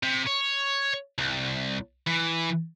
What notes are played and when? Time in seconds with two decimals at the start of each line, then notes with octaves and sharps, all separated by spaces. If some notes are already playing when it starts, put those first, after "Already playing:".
0.03 C3
0.26 C#5
1.18 C2
2.07 E3